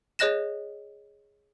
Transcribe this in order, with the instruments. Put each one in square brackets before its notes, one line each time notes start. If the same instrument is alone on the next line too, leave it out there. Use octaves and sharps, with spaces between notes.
[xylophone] G#4 C#5 D#5 F#6 A#6 E7